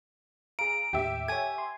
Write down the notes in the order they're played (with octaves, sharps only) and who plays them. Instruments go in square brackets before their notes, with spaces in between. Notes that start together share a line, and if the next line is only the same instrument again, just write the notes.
[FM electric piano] G#4 F5 [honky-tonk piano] A#5 [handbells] D7
[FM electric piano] D#2 A2 [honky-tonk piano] G4 E5
[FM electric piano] A4 C#5 [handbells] G#5 G#6
[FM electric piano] C6